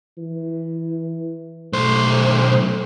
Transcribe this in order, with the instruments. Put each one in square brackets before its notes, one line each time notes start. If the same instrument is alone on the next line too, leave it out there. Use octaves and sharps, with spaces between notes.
[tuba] E3
[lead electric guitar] B1 C5 [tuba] A3